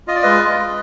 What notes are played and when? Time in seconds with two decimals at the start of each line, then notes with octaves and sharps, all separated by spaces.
0.08 F4 D#5
0.15 D5
0.22 G#3 B4 D#5
0.42 G#3
0.59 G#3